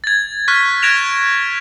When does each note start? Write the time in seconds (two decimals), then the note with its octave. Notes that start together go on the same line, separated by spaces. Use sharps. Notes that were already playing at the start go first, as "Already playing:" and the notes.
0.04 G#6 A6
0.48 C#6 F6 F#6 B6
0.83 F#6 G#6 A#6 D7 E7 F7